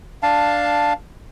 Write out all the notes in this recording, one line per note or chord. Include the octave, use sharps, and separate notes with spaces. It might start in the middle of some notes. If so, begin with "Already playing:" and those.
D4 F5 A5